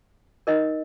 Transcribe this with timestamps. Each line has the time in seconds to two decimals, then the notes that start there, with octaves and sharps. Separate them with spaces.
0.47 D#4 A#4 D#5